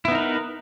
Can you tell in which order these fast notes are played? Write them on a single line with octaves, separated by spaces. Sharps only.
E4 B3 D#4 A#4 B4